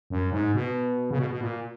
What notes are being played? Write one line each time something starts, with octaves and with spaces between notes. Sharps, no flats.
F#2
G#2
B2
C#3
B2
B2
A#2